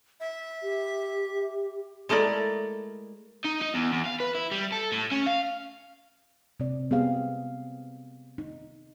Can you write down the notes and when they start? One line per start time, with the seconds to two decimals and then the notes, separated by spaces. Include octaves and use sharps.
0.20 E5
0.63 G4
2.09 G#3 A3 E4 A#4 D5
3.45 D#4
3.62 D#4
3.74 E2
3.93 E2
4.06 F5
4.20 B4
4.35 E4
4.51 G3
4.72 A4
4.92 A2
5.12 C#4
5.27 F5
6.60 C3 C4 D5
6.91 B3 C4 G4 G#4 F5
8.38 D#4